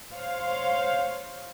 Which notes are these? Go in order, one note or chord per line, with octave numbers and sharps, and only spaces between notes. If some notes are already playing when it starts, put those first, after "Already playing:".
C5 C#5 F5